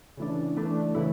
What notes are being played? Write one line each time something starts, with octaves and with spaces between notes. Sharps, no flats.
C#3 E3 A3 D4
E3 A3 D4
C#3 E3 A3 E4